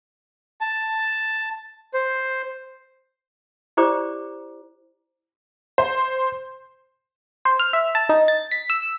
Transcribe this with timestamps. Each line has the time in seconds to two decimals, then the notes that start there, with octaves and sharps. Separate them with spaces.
0.61 A5
1.94 C5
3.77 E4 G4 C5 D5 A#5 D6
5.78 C5
7.45 C5
7.59 F6
7.73 E5
7.95 A5
8.09 D#4
8.28 A6
8.52 B6
8.70 E6